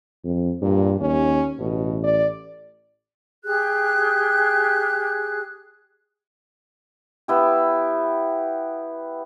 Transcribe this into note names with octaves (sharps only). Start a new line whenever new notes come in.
F2
G2 A#2
D#2 C#4
A1 B2
D5
G4 G#4 F#6
B3 E4 G4